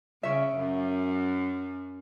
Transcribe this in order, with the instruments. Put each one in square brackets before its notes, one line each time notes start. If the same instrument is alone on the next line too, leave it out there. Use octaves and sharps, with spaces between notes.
[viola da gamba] C#3 [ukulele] C#4 E5
[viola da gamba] F#2